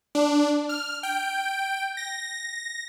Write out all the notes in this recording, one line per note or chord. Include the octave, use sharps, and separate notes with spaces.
D4
F6
G5
A#6